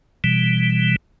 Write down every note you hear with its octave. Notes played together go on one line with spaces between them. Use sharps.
B2 E3 G3